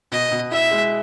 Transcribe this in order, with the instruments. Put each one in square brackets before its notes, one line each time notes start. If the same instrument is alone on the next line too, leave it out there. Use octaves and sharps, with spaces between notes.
[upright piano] B2 [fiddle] D#5
[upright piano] B2
[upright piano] E4 [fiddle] E5
[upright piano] G#3